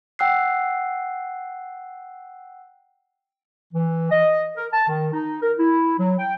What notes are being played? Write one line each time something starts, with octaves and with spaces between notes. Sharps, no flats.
F#5 G5 E6 F#6 C7
E3
D#5
A#4
A5
D#3
D#4
A#4
E4
F#3
G5